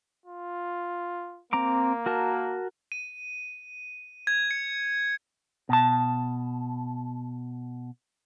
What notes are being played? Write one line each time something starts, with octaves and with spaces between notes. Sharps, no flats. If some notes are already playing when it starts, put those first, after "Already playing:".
F4
A#3 C4 A#5 D6
F#4 A#4 A5
D#7
G#6
C#7
B2 A5